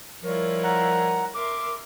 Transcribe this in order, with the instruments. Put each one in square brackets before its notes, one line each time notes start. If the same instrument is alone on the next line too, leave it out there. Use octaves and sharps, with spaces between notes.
[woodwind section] F3 G3 A#4 [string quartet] E4 F4 C#5
[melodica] F#5 A#5
[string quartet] A#4 E5 C6 [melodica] D6